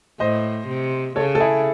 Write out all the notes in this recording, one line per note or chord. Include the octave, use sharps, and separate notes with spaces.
A2 C5 D#5
C3
C#3 A4 C#5
A4
E4 G#4